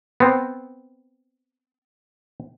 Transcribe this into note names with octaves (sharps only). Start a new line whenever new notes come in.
B3 C4